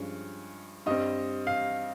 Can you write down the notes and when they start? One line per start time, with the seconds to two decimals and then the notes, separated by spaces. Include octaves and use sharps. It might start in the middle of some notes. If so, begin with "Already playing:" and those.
Already playing: G2 F3 G#3 C#4
0.86 G2 G3 C4 D#5
1.47 F5